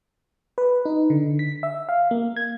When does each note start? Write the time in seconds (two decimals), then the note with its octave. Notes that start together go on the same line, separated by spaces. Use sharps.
0.58 B4
0.85 D#4
1.10 D3
1.39 B6
1.63 E5
1.89 F5
2.11 A#3
2.36 G#6